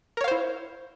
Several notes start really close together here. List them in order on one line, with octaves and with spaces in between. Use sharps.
A#4 C#5 F5 C5 E4